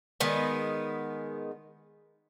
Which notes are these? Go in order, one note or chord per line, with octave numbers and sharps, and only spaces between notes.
D#3 G#3 B3